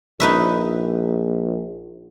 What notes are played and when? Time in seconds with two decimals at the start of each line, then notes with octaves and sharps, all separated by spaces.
0.20 A#1 D#4 B4 E5